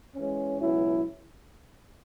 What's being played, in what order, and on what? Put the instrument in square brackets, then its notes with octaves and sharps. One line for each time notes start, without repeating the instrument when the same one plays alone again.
[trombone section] E3 G#3 C#4
C#2 B2 F#3 C#4 E4